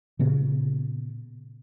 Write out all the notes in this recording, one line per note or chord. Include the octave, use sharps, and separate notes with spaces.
A#2 C#3 B3